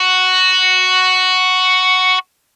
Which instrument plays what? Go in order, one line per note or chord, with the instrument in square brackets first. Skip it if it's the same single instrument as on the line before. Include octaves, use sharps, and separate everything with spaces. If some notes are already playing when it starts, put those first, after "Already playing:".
Already playing: [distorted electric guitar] F#4